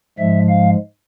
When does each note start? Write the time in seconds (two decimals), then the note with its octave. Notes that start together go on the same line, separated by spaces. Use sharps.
0.18 G#2 F3 G#3 E5
0.49 F5